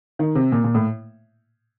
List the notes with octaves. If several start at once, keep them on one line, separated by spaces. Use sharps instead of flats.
D#3
C3
A#2
A#2
A2